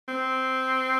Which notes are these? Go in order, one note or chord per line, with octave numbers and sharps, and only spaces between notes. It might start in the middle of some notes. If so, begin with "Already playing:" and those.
C4